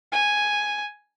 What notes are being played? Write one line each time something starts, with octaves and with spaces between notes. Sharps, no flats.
G#5